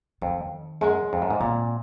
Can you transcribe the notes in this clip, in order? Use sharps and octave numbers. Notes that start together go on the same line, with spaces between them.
F2 D#3
F#2 G#3
F2
F#2
G#2
A#2 C4